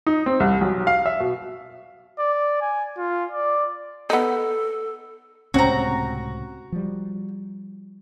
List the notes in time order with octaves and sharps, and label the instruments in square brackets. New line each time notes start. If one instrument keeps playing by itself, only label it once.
[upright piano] D#4
C4
C2
B1
F5
E5
B2
[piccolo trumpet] D5
G#5
F4
D5
[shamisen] B3 D#4 [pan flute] A4
[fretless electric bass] C#2 A2 C3 [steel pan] C4 C#4 [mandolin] F#4 A#5
[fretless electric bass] F3 G3